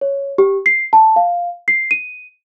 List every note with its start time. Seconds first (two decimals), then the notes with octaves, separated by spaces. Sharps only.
0.01 C#5
0.38 G4
0.66 C7
0.93 A5
1.16 F5
1.68 C7
1.91 D#7